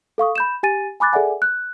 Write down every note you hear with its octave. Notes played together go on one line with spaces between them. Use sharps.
A4 F5 C#6 D#6
B5 G6 E7
G4 G#5 A6 D#7
G#5 B5 D6 F#6 A6
G#4 A4 D5 E5 F#5 G#5
F#6